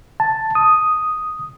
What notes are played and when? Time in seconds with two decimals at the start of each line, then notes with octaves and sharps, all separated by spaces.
0.20 A5
0.55 D#6